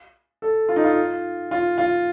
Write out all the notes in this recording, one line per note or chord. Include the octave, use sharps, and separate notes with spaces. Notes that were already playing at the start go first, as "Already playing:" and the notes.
A4
F4
D#4
F4
F4
F4